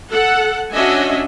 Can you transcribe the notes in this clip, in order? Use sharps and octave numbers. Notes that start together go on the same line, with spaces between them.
A4 F#5
C#4 D4 F#4 D#5 E5 G#5